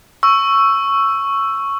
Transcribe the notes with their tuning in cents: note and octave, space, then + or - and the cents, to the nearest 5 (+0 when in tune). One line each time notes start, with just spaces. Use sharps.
C#6 +0 E6 +10